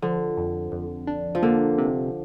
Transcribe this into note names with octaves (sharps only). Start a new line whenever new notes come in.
D3 F3
F2
F2
D4
F3
D3 A#3
C3